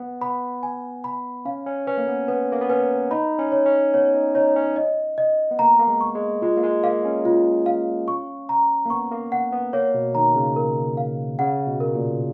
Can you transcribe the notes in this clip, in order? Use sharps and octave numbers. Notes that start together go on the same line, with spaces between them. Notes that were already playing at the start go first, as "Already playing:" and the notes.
Already playing: B3
B3 B5
G#5
B5
C#4 F5
C#4
C#4 B4
A#3
B3
B3 B4
A#3
B3
C#4 B4
D#4 B5
C#4
C#5
C#4
B3 C#5
D#4
D#4 C#5
C#4
D#5
D#5
B3
A#3 A#5
A#3
G#3
C#6
G#3
G#3 F4
A#3
G#3
A#3 F5
C#4
F4
F5
C#6
A#5
A#3
B3 C#6
A#3
F#5
B3
A#3 C#5
B2
D#3 A#5
C#3
A#4
F5
C#3 F#5
B2
A#4
A#2